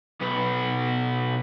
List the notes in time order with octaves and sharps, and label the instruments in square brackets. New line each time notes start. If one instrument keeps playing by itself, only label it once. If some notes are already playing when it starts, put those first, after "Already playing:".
[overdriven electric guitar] B1 B3